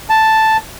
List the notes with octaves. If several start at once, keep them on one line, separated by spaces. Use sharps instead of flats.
A5